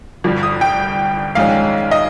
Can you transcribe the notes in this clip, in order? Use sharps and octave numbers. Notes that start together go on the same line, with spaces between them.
G1 G2 F3
D#6
G5
A#1 G#2 D#3 G#3 C#4 F5
D#5